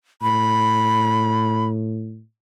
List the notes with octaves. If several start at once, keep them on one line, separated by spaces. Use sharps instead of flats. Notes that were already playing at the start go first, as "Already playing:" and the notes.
A2 B5